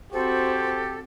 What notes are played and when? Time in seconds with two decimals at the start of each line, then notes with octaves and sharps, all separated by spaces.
0.13 C4 F#4 G4 A4 C5